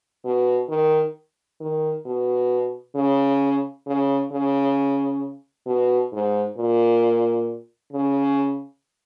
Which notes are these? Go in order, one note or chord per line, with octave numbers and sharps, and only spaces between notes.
B2
D#3
D#3
B2
C#3
C#3
C#3
B2
G#2
A#2
C#3